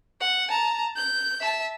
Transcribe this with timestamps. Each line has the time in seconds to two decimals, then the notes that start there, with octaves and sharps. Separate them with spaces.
0.20 F#5
0.50 A5 A#5
0.96 G6
1.40 E5 A5